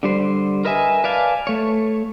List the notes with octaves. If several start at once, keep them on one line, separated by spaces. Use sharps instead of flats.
D3 G3 C5
A#4 B4 D#5 E5 G#5
B4 D5 F5 G#5 A5
A3 C#5